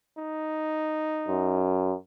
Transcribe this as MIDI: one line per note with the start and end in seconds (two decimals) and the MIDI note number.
0.18 1.72 63
1.28 1.95 42